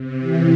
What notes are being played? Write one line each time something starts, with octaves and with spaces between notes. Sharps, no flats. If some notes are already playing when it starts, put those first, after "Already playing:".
Already playing: C3
E3